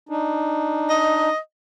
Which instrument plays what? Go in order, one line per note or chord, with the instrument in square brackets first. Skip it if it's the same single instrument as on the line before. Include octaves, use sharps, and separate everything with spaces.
[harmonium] D4 D#4
[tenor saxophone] D#5